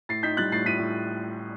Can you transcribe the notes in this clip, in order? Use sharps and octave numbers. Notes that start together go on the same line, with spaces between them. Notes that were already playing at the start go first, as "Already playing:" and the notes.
A2 A6 C7
D#4 G6 B6
G3 F#6 A6
A2 A6 C7
A2 B6 D#7
A2